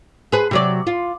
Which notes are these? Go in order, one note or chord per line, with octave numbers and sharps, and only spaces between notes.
G#4 B4
C3 F#3 D5
F4